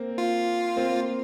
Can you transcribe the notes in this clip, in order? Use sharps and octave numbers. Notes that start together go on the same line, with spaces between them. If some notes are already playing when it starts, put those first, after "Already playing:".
Already playing: A#3 C4
F4
A#3 C4